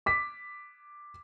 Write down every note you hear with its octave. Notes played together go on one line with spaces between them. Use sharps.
D6 B6